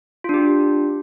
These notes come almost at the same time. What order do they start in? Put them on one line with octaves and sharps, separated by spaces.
F4 D4 G4